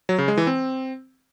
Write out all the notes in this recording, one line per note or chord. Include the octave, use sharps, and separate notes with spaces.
F#3
C#3
G#3
E3
C4